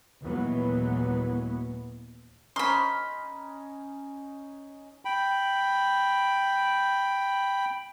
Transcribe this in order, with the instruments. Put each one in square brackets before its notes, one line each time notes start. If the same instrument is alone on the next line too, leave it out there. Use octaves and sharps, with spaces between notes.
[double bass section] D#2 A#2 E3 F#3 G#3 B3
[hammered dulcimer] C#4 D#4 [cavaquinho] B5 C6
[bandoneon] G5 B5